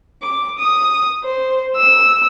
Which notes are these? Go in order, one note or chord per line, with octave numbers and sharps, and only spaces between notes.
D6
D#6
C5
E6